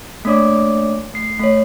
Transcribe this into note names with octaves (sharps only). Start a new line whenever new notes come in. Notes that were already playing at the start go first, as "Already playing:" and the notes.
A3 A#3 D4 C#5 D5 D6
A3 C7
A3 C#5